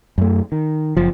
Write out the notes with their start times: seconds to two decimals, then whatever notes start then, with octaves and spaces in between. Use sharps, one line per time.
0.18 F#2 A3
0.52 D#3
0.97 F#1 F3